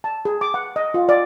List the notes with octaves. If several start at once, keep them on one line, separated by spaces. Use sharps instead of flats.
A5
G#4
D6
F#5
D#5
F4
D5